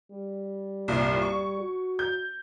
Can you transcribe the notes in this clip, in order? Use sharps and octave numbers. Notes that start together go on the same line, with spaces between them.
G3
C2 G2 A#2
C#6
F#4
G6